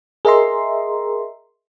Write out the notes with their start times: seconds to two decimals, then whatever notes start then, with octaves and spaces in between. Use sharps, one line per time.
0.25 G#4 A#4 D#5 E5 A#5 C6